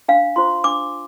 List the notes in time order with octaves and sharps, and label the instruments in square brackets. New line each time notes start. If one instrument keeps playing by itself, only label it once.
[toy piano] D4 F5
F4 C5 C6
D4 D6